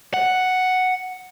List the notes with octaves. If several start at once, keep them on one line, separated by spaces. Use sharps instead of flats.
F#5